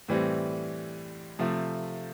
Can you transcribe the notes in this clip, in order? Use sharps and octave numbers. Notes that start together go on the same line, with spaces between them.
A2 E3 G3 C4
C3 F3 A3